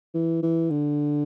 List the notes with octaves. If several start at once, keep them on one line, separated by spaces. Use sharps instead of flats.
E3
E3
D3